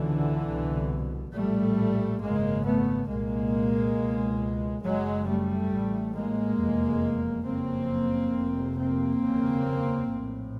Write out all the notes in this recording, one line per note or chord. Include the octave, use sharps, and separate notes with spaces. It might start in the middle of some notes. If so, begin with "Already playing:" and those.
Already playing: C#2 B2 D3 E3
C2 B2
A#1 A2 G3 A3
G#1 F#2 C#3 G#3 A#3
A3 B3
C2 A#2 G#3 A#3
C#2 B2
F#1 F#2 C#3 F#3 G#3
G3 A3
A1 A2
G#3 A#3
F1 E2 C3
F#1 F2 C#3 A#3 C4
F1 F2 C3
A#3 C4
F1 D#2 C#3
A#1 A2